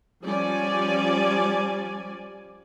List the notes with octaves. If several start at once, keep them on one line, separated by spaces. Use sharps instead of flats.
F3 G3 C#4 D5 G#5